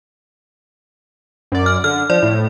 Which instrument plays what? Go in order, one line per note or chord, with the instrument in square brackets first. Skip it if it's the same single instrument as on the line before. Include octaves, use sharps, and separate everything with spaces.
[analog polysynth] F#2 D5
[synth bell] F6
[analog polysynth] D3 [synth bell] F6
[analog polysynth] F3 [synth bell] D5
[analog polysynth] A2